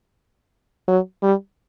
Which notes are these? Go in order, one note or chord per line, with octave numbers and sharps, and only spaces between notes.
F#3
G3